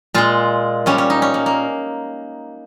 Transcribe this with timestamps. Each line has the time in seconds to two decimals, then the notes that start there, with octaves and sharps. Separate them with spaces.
0.14 A#2 G#3 F4
0.86 A#2 G3 C#4
0.98 C#4
1.10 D#4
1.22 C#4
1.34 A#3
1.46 A#3